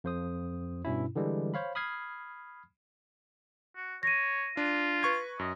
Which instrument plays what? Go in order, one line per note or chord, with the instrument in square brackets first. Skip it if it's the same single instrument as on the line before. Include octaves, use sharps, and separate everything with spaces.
[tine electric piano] F2 C5 D#6
G2 B2 C#4 E4
D3 E3 G3 G#3
C5 C#5 F5 B5
B5 D#6 F6 G#6 C7
[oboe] F#4
[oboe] C#5 [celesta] A#6 D#7
[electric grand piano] D4 [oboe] F4
[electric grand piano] B4 C#6 G#6
[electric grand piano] F#2 [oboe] D#5